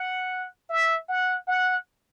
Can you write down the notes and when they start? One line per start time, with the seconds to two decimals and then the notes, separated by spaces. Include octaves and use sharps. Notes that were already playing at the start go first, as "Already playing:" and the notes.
Already playing: F#5
0.70 E5
1.09 F#5
1.48 F#5